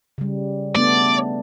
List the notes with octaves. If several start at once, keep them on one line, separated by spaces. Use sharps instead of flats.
C#3 G3
A3 B3 D4 D5